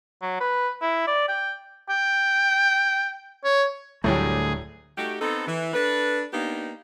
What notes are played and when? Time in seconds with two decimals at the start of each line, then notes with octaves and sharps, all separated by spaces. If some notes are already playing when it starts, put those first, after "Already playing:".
0.22 F#3
0.41 B4
0.82 E4
1.07 D5
1.28 G5
1.89 G5
3.44 C#5
4.04 D1 A2 D3 F#3 G3 A3 G#4
4.98 A3 D#4 F#4 G4
5.21 B3 C4 D#4 A4
5.47 E3
5.74 D4 A4 B4
6.33 A#3 B3 D4 D#4 G4